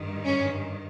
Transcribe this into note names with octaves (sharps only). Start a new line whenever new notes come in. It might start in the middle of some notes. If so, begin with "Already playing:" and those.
Already playing: G2 D#3
C#4